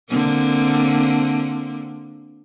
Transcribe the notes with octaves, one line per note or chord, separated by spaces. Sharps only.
D3 A#3 C4